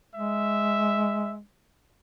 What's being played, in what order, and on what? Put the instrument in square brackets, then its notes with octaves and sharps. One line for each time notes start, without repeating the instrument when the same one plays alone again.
[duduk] G#3 [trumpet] E5